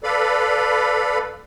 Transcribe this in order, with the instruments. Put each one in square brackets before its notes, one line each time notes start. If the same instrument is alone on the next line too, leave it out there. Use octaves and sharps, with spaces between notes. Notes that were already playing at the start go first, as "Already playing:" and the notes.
[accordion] A4 B4 D5 F5 B5